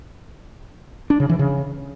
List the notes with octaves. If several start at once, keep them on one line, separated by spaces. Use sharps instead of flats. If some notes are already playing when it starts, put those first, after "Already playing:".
D4
C#3
E3
C#3